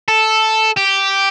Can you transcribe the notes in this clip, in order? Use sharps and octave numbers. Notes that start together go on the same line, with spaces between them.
A4
G4